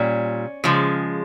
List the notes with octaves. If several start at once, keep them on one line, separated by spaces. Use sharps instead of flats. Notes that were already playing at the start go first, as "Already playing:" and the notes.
Already playing: A#2 G3 C#4
C#3 F3 G#3